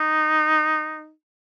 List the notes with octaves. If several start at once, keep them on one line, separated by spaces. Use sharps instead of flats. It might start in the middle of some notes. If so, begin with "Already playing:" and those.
Already playing: D#4